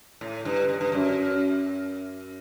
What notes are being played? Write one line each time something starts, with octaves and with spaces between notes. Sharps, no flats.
A2
G2
G2
G2
F#2